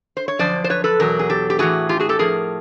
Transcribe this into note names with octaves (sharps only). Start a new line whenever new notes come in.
C5
C#5
F#2 D3 F3 C5 D5
C5
B4 C#5
A4 B4
E2 B2 F#3 A#4
G#4
G4 A4
G4
A2 E3 F#4 G#4
F4 G4
F#4 G#4
G4 A4
A2 F3 G#4 A#4